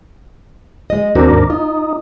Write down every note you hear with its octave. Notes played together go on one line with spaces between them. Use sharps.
G#3 D#5
D#2 C4 D4 F#4 A#4
G#2
D#4 F4